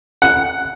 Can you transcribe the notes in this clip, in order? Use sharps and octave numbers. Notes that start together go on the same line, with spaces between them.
F#5